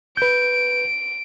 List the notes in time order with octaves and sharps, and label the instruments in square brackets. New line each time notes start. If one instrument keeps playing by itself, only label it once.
[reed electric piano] B4 G6 [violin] D7